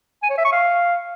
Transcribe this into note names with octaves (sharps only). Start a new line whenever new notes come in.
G#5
C#5
E5
C#6
F5